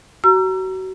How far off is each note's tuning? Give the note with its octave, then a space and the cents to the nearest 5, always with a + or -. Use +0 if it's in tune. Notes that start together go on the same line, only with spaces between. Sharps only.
F#4 +30 A#5 +0 E6 +35